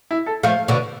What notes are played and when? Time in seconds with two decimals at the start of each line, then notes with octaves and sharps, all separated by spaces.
0.11 E4
0.26 A4
0.43 F3 A3 F5
0.68 B2 D3